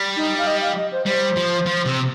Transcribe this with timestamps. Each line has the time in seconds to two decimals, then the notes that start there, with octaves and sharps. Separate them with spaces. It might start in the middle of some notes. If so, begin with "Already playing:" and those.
Already playing: G3
0.16 D#4
0.38 F5
0.47 D#5
0.61 F5
0.76 D#5
0.92 C5
1.06 G3 C5
1.36 F3
1.66 F3
1.86 C3